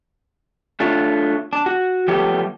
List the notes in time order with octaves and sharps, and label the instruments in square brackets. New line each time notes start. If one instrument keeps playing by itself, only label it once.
[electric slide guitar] A3 D4 F4 C#5
D4
F#4
F3 G3 A3 B3 G4 C#5